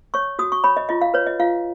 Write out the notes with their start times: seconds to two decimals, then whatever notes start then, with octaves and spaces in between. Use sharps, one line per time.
0.14 C#5 C#6
0.39 F#4 D#6
0.52 C#6
0.64 C#5 B5
0.77 D#5
0.89 F4 D#5
1.02 F5
1.14 B4 C#5
1.27 D#5
1.40 F4 F5